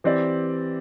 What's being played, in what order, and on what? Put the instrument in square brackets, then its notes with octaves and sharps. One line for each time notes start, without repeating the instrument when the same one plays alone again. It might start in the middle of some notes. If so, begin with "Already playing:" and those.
[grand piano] E3 C4 G4 D5